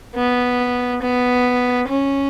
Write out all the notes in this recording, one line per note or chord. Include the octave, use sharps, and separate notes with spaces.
B3
B3
C#4